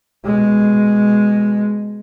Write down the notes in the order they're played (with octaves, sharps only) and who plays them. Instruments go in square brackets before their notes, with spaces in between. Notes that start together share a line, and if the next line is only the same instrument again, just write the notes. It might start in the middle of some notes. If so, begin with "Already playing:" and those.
[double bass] B2 G#3